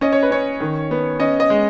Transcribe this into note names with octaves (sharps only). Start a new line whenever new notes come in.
C#4 D#5
C#5
B4
C#4 C#5
D#3
B3
C#4 D#5
D#5
G#3